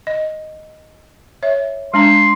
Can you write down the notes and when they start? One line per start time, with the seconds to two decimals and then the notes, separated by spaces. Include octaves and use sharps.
0.07 D#5
1.43 C#5 E5
1.94 G#3 D4 A#5 C6